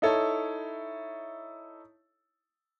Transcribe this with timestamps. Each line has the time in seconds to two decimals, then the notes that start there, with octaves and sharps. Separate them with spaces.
0.02 D#4 E4 A4 C#5